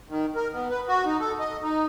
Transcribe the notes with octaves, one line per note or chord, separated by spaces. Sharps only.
D#3
A#4
B3
B4
F#4
D#4
A4
D#5
D#4